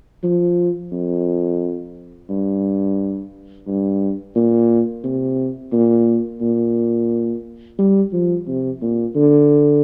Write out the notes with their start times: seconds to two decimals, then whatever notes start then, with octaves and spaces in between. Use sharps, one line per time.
0.24 F3
0.92 F2
2.30 G2
3.67 G2
4.35 A#2
5.04 C3
5.72 A#2
6.41 A#2
7.79 G3
8.13 F3
8.47 C3
8.82 A#2
9.16 D3